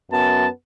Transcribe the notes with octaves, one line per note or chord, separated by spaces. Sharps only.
F#2 F#3 B3 A5